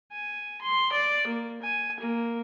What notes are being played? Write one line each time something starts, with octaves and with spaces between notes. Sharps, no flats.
G#5
C6
D5
A#3
G#5
A#3